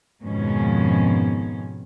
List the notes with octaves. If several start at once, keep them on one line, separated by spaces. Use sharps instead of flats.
F2 G#2 B2 D#3 F3 C#4